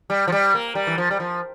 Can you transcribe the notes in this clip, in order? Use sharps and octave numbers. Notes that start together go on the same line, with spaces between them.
G3
F3
G3
A#3
G3
E3
F3
G3
F3